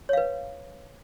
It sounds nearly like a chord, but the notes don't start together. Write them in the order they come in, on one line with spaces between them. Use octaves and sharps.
C#5 F5 B4